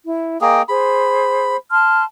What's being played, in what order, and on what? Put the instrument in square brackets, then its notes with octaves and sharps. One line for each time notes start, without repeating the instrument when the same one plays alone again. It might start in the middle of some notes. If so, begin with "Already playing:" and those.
[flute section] E4
[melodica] A#3 G#4 [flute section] D#5 G5
[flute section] G#4 C5 [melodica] B5
[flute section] A5 C6 F6